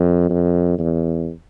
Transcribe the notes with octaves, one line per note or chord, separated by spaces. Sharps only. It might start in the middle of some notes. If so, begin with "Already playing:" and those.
Already playing: F2
F2
E2